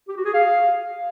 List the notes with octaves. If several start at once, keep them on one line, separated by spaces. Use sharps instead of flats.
G4
F#4
G#4
F5